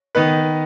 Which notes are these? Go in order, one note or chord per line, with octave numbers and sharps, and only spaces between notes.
D#3 B3 D#4 B4